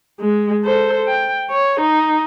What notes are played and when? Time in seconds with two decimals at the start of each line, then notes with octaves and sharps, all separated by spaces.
0.20 G#3
0.64 A4 C5
1.06 G5
1.50 C#5
1.81 D#4